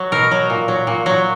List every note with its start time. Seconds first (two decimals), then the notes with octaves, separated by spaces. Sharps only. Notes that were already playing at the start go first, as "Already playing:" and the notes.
Already playing: F#3
0.12 B2 A#4
0.31 F#3
0.50 A#2
0.68 F#3
0.87 A#2
1.06 F#3